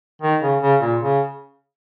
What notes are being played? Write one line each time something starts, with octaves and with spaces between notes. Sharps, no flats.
D#3
C#3
C#3
A#2
C#3